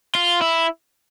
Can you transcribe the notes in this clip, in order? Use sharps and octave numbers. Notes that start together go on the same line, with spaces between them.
F4
E4